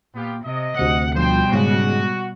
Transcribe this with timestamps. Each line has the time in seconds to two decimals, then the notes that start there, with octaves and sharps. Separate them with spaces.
0.14 A#2 B3 F4 G4
0.44 C3 D#5
0.77 D2 C3 F#5 C#7
1.16 D2 B2 F3 G3 C5 G5
1.53 G#2 C#3 G#3 F#4